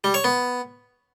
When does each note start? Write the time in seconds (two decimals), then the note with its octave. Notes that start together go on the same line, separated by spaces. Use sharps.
0.04 G3
0.14 C#5
0.24 B3